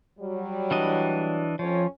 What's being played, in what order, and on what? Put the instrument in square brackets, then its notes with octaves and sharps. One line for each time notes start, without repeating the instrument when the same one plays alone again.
[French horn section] F#3 G3
[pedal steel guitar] E3 D4 D#5
[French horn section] F2 C#4 C#5 [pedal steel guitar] F3